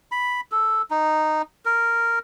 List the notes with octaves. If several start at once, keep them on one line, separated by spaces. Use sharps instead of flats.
B5
A4
D#4
A#4